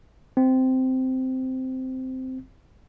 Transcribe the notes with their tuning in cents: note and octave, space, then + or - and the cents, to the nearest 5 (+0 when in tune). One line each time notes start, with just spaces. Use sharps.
C4 -10